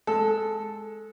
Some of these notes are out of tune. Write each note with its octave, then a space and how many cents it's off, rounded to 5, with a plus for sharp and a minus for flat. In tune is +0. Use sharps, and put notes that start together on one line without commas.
G#3 +15 A4 +0